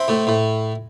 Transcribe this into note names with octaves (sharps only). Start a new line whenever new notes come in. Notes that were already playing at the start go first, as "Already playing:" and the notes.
Already playing: C4 E4
A2
A2